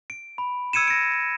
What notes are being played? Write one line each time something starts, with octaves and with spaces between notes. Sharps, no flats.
D7
B5
E6 G#6 C#7 D#7 E7
A#6 D7